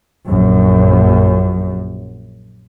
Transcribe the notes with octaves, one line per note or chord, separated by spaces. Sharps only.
A#1 F#2